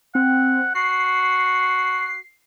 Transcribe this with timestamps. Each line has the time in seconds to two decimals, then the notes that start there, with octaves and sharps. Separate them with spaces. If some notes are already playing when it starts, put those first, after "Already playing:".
0.15 C4 F#5
0.75 F#4 C7